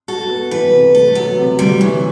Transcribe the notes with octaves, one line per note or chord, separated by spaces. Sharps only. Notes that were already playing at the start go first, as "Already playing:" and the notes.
F#4 A4
B3
E3 B4
C3
A3 A4
F#3 B3
C3
D2 G3
E3 F#3